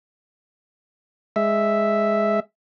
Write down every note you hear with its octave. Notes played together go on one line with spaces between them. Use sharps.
G#3 E5